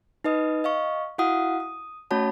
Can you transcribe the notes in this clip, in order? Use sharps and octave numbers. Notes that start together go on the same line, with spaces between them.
D#4 B4 D#5 D#6
D#5 F5 C#6
E4 F#4 F5 F#5 D#6
D#6
A3 C#4 F#4 C#5 A5 B5